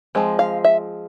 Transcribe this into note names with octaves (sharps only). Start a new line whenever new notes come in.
F3 G#3 C4
F5
E5